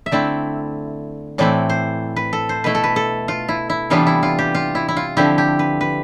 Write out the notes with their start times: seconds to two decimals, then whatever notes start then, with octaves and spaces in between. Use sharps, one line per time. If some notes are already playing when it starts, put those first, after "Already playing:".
0.06 E5
0.11 D3 A3 C4 E4 D5
1.38 A2 E3 A3 C4 E4 D5
1.69 C5
2.16 B4
2.33 A4
2.49 C5
2.64 B2 A3 E4 B4
2.75 A4
2.84 B4
2.96 A4
3.28 F4
3.48 E4
3.70 E4
3.90 C3 E3 G3 B3 D4 F4
4.07 E4
4.23 F4
4.39 G4
4.55 F4
4.75 E4
4.88 E4
4.97 F4
5.17 D3 F3 C4 E4 G4
5.38 G4
5.59 B4
5.81 B4